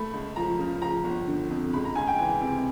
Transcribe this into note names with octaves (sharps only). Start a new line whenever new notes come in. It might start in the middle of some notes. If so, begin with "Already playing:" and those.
Already playing: A3 B5
C#2
F3 A#5
C#3
F3 A#5
G1
D3
F2
C#2 B5
A#5
C#2 G#5
G5
E3 G#5
C3